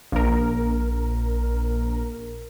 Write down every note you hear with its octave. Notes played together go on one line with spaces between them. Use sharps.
A#1 A#4